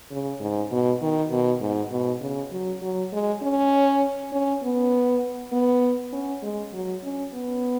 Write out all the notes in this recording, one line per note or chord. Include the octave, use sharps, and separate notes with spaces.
C#3
G#2
B2
D#3
B2
G#2
B2
C#3
F#3
F#3
G#3
C#4
C#4
B3
B3
C#4
G#3
F#3
C#4
B3